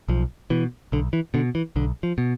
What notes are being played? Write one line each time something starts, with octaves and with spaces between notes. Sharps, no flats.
B1 F3
B2 E3
B1 D3
E3
B2 D3
E3
B1 D3
F3
B2